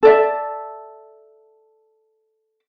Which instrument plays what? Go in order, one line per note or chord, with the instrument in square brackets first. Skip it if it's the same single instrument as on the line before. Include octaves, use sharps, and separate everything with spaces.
[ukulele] A4 D5 E5